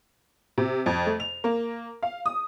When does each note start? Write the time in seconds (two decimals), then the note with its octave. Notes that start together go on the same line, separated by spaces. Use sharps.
0.58 C3
0.86 F2
1.06 A3
1.20 F7
1.44 A#3
2.03 F5
2.26 D#6